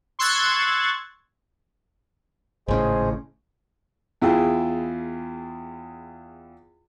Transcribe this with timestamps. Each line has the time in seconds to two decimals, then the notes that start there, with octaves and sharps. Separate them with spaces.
0.19 C6 C#6 E6 F#6 G#6 A6
2.68 G#1 A2 C#3 G#4 C5 D#5
4.22 E2 E4 F4 G#4 G5